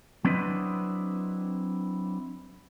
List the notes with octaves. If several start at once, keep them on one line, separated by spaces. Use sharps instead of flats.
F#3 C4 D4 E4 B4 D#5